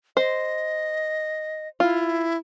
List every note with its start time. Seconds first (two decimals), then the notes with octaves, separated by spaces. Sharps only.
0.17 C5 D#5
1.80 E4 F4